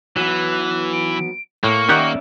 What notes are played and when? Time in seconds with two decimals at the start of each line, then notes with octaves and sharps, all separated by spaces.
0.17 E3 F#3 B3 F#6
0.92 D7
1.64 A2 A#3 C#6
1.89 D#3 C#4 G4 D5 E5 F#5